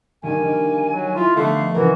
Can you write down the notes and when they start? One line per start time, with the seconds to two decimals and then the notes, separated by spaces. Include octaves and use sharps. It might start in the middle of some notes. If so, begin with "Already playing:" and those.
0.23 D3 D#3 G3 A#3 G#5
0.42 D#3 F5 D7
0.93 F#3
1.16 E4 F4
1.36 D3 F3 A3 B3 D#5 F5
1.74 A#2 C#3 E3 F#4 A#4